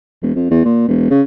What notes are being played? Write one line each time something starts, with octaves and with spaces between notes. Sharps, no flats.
E1
F2
E2
A#2
E1
C#3